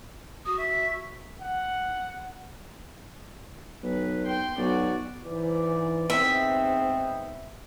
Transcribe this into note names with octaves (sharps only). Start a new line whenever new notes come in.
F#4 D#6
E5
F#5
B1 B4
G5 C6
B1 F#4 D5
G#2 E3 D5
G#2 B3 C4 E5